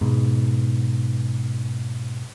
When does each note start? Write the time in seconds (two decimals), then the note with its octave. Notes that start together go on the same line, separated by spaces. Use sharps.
0.01 G#2 B2